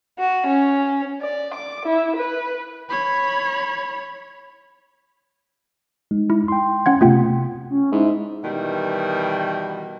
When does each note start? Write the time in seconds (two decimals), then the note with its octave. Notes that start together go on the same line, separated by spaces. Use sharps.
0.19 F#4
0.47 C#4
1.22 D5
1.54 D6
1.86 E4
2.16 B4
2.90 C#5 B5
6.11 G#3 D#4
6.30 E4
6.48 G5 C6
6.86 C#4 F#5 G#6
7.01 C3 A3 B3 F4 G5
7.70 C#4
7.92 G#2 E4
8.44 B2 D#3 E3 G3